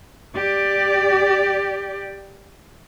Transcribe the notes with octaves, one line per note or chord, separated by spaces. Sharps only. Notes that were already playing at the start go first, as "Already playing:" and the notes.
G4 D5